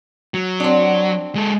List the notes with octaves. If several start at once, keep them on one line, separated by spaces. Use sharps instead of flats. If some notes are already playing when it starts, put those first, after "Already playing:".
F#3
C4 D4
G#3 A4